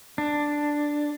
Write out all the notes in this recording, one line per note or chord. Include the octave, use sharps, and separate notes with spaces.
D4